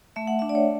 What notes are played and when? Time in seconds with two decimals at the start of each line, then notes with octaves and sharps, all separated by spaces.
0.16 A3 E5
0.27 F#5
0.39 E5
0.42 D4
0.49 D5
0.55 C#5